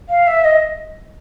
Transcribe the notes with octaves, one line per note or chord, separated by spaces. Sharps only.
F5
E5
D#5